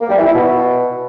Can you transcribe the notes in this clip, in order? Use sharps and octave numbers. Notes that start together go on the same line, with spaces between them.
A#3
G3
E3
E4
B2